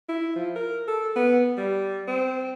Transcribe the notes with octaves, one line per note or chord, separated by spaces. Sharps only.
E4
F3
A#4
A4
B3
G3
C4